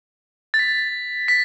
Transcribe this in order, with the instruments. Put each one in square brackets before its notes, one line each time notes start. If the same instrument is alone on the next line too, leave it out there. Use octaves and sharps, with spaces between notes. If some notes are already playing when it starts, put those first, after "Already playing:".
[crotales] A6
B6
B6